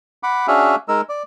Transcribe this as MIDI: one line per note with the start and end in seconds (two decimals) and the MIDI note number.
0.23 0.47 78
0.23 0.47 83
0.23 0.47 86
0.48 0.76 61
0.48 0.76 62
0.48 0.76 66
0.48 0.76 68
0.48 0.76 76
0.48 0.76 77
0.88 1.01 56
0.88 1.01 63
0.88 1.01 70
0.88 1.01 88
1.09 1.23 74